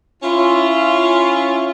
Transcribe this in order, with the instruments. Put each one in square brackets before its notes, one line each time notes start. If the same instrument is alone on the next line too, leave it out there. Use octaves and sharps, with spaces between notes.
[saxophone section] C#4 E4 F4